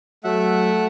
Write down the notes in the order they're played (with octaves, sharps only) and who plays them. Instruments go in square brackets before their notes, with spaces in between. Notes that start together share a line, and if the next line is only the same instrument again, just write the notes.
[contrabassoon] F#3 [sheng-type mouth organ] A3 E5 F#5